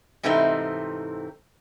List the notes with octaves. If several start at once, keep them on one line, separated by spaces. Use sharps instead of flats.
G#2 C3 E3 A3 C4 D#4